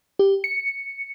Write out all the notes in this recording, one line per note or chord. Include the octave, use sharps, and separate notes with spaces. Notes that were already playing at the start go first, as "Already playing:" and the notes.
G4
C#7